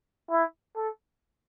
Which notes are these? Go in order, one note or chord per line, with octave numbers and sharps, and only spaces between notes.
E4
A4